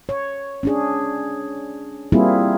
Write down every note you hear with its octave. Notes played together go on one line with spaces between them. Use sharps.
C#5
C#4 D4 G#4
G3 A#3 C4 E4 F4 G#4